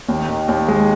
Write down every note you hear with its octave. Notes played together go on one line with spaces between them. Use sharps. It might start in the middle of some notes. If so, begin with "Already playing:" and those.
D#2
D#3
D#2
G#3